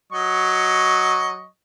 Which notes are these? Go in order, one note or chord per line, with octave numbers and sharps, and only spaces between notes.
F#3 D#5 C#6